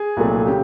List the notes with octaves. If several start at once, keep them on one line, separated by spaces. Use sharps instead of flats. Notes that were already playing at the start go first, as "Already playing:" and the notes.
Already playing: G#4
C2 A#2 F#3 A3
C#3 G4